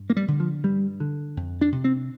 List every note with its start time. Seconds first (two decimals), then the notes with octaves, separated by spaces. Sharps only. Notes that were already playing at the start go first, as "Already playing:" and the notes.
Already playing: G2
0.10 A#3
0.17 G3
0.28 D3
0.40 F3
0.64 G2 G3
1.00 D3
1.37 F2
1.61 D4
1.72 C3
1.84 C4